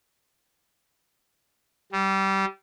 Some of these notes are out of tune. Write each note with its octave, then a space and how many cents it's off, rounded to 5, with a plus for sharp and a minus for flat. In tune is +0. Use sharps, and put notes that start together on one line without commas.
G3 -20